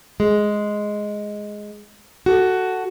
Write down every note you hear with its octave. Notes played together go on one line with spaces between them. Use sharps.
G#3
F#4 A4